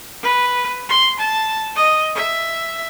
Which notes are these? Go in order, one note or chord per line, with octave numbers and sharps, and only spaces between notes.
B4
C6
A5
D#5
E5